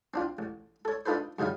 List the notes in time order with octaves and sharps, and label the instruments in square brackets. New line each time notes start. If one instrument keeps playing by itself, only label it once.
[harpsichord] C4 D4 F4
A1
A4 C#5
D4 D#4 F4 A4 B4 C5
F#2 C#3 G3 D#4 F5